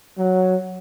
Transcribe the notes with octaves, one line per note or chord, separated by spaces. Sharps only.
F#3